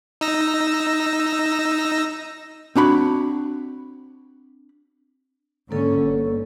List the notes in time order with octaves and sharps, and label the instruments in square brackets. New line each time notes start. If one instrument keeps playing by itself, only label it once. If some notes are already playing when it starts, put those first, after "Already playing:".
[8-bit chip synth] D#4 E6 A#6
[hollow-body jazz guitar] C4 D4 F#4 B5
[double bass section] G#2 D3 C#4 [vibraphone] A#3 A4
[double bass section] G1